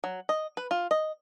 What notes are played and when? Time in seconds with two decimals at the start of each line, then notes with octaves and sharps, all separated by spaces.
0.04 F#3
0.29 D#5
0.57 B4
0.71 F4
0.91 D#5